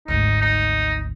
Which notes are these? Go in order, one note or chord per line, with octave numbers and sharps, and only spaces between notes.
G#1 D2 D#4
D#4